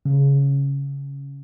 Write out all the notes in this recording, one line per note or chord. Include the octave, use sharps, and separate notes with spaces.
C#3